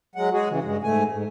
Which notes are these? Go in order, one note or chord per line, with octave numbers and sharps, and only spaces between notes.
F#3 G#3 F#5
G#3 F#4 G#4
C#3 E3
G2 G#3
G#2 A3 G#5
G#2